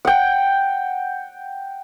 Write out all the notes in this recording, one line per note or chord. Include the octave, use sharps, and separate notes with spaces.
F#5 G5